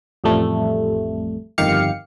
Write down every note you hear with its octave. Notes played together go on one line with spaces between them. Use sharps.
A1 F2 G3 A3
G1 F2 D#3 G4 F5 C#7